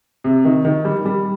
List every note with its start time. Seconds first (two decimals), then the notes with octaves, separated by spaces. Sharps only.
0.24 C3
0.45 D#3
0.65 D#3
0.85 G3
1.05 G3